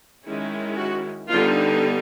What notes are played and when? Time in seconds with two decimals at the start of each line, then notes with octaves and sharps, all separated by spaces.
0.26 D#3 G#3 C#4 E4
0.77 F#4
1.28 D3 G3 B3 D#4 F4